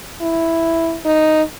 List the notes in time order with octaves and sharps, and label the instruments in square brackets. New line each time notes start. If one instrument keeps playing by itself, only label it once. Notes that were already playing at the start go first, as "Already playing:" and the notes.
[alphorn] E4
D#4